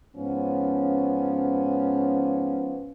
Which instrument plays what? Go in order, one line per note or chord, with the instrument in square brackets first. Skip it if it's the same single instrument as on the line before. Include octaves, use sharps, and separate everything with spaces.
[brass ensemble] G#2 F3 B3 C#4